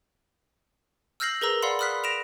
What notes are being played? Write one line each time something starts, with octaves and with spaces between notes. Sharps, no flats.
E6 F6 G6 A#6 C7 F#7
G#4 A#4 B4 A#5 E6
D5 F5 F#5 B5 C6
B5 D#6 F6 F#6 B6
A#6 D7 E7 F7